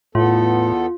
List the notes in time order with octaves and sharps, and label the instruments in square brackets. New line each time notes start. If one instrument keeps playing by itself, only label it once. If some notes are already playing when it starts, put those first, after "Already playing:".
[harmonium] E2 B3 A4 [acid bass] A2 [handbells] F4